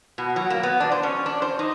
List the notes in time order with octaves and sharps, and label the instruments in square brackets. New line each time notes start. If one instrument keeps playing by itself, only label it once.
[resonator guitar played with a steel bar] B2
F#3
A#3
B3
D4
C5
C#4
D4
C5
D#4